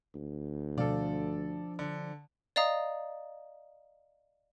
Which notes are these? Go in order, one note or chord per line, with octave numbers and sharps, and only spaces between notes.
D2
B2 F3 D4 A4 D5 F5
D3
D5 D#5 F5 A#5 D#6